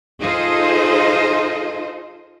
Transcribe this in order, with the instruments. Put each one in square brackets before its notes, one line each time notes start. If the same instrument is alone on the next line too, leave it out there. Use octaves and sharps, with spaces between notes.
[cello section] D#4 F4 G#4 A4 C5 D#5